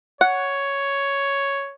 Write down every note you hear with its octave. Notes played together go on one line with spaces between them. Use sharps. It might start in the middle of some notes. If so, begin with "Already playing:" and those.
C#5 F#5